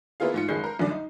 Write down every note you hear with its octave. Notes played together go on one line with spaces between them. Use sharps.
A#3 B3 E4 F4 G#4 F5
G#2 F4 C#7
F#1 D#3 G#3 G#4 G6 C7
A#4
C2 F#2 D3 D5
D#4